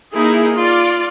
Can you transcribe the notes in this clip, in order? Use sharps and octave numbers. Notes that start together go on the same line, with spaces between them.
A#3 D#4 E4 G#4
F4 D5